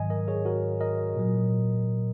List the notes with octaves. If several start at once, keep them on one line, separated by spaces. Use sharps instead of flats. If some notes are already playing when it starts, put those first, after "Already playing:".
Already playing: G#2 D#3 F#3 D#5 G#5
A#4 D#5
G#4 C#5
F#4 A#4
A#4 D#5
A#2 F#3